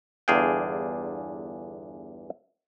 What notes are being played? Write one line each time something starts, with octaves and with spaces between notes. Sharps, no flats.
G1 E2 D4 G#4 F5 G5